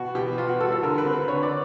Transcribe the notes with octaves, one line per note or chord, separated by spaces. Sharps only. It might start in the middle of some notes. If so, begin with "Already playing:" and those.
Already playing: B2 F#4
B2 G4
B3 F4
F#4
G3 A4
A4
D3 A#4
B4
C4
B4
D3 C#5
D5